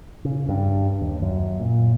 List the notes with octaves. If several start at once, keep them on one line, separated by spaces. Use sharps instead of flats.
C#3
G2
D#2
F#2
A#2